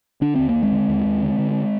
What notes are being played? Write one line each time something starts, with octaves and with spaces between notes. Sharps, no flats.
D3 D4
D#2 C4
A#3
D#2
G#3 C4
D3
D#2
D#2
D3
D3